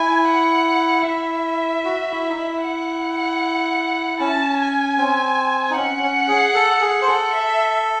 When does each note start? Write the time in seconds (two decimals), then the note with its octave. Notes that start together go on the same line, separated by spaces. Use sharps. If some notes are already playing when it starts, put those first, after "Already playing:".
Already playing: E4 G#5
0.28 F#5
1.06 E4 E5
1.85 F#4
2.12 E4
2.29 D#4
2.36 E4
2.63 F#5
4.20 C#4 A5
4.59 G#5
4.98 C4
5.71 D#4
5.76 C#4 F#5
6.03 C#4
6.28 G#4
6.54 A4
6.81 G#4
7.02 C5
7.07 A4
7.33 E5